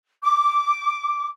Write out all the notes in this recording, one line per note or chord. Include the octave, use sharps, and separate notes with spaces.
D6